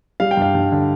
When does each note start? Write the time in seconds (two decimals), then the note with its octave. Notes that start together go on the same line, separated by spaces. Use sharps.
0.20 G3 F5
0.31 G5
0.37 G2 F5
0.55 G2
0.72 D3